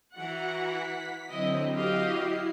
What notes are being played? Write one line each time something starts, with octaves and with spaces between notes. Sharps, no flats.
E3 F#4 F#5 A#5
B6
D3 F#3 C4 E4 D#5
E4 F#4 G4 D#5 F5
E4 C7